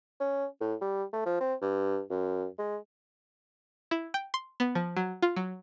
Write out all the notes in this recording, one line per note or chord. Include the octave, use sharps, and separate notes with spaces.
C#4
A2
G3
A3
F3
C4
G2
F#2
G#3
E4
G5
C6
B3
F3
F#3
F4
F#3